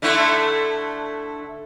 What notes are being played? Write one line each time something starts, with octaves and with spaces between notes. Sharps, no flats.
D3 A3 E4